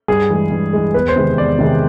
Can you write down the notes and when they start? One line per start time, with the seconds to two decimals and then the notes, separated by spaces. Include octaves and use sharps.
0.08 G2 G#4
0.30 E3 G#3
0.51 G2
0.73 E3 G#3
0.94 E2 B4
1.08 C5
1.16 C3 D#3 G#3
1.38 E2 D5
1.59 C3 D#3 G#3